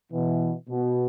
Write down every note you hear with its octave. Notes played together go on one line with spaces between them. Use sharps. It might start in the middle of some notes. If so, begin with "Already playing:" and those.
B2 E3
B2